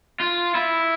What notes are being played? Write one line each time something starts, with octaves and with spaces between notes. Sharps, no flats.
F4
E4